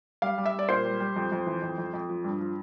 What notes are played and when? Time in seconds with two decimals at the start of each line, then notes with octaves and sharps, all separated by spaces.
0.22 G3 F5
0.38 G3
0.46 E5
0.54 G3
0.59 D5
0.69 A#2 C5
0.84 G3
1.00 G3
1.16 F2
1.32 F2
1.46 E3
1.62 F2
1.78 F2
1.93 F2
2.09 F3
2.24 G2
2.41 F3